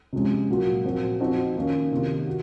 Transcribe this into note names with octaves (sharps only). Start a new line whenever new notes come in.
C3 F3 G#3 C#4 F4
A#2 F#3 A#3 F4
A#2 F3 C4 F#4
F3 C4 D#4 F#4
D#3 A#3 C#4
C3 D#3 A#3 F4
F#4